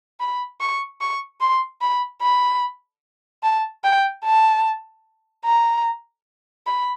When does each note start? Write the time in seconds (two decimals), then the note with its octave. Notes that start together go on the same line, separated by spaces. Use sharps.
0.20 B5
0.61 C#6
1.01 C#6
1.40 C6
1.81 B5
2.22 B5
3.43 A5
3.84 G5
4.24 A5
5.45 A#5
6.66 B5